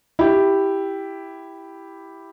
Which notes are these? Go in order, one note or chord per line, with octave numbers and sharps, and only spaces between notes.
E4 G4